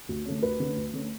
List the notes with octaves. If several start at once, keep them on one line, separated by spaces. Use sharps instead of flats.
D2
D3 A3 C#4
D2 B4
D3 A3 C#4
D2
D3 A3 C#4